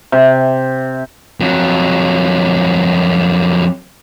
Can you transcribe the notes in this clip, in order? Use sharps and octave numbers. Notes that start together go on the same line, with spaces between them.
C3
F2 F#3